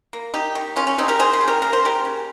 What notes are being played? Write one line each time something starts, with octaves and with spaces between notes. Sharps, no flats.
A#3
D#3 D#4 G4
D#3
C#3 C#4 F4
C#4
C#3 C4 D#4
G4 A#4
C#3 G#4 C5
G#4 C5
C#3
G4 A#4
A#3 A#4
C5
C#3 G4 A#4
C#3